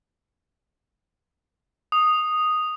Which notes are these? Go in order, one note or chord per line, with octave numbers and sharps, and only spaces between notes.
D#6